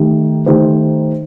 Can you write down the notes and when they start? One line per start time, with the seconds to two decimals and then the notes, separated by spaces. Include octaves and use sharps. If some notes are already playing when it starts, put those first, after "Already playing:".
Already playing: D#3 A3 D#4 G4
0.46 D#3 A3 D#4 G4 C5